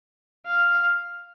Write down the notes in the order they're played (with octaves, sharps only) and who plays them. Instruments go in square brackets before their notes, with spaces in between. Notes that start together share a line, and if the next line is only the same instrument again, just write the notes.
[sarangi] F5